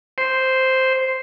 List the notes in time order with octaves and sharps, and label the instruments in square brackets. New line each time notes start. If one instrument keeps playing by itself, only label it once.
[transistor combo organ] C5